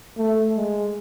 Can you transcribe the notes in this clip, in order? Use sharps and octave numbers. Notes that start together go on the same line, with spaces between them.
A3
G#3